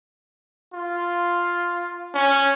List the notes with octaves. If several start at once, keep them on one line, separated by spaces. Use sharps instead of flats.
F4
C#4